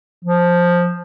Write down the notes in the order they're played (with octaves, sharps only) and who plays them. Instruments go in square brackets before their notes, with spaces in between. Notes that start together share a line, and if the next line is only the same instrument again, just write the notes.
[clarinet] F3